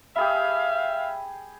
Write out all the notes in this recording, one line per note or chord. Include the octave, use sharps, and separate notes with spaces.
G4 G#4 E5 F5 B5